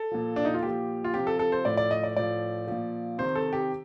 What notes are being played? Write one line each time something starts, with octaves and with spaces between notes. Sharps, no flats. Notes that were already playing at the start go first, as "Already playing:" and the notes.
Already playing: A4
A#2 F3
D4
D#4
F4
A#2 F3 G4
F4
C3 F3 G4
A4
A4
C5
A2 F3 D5
D5
D#5
D5
A2 F3 D5
A#2 F3
C3 D#3 C5
A4
G4